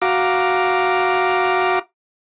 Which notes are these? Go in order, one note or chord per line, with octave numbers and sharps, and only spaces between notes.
F#4 F5 A#5 D6